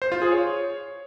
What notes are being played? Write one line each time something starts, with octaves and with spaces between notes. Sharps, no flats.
C5
F4
G#4
C#5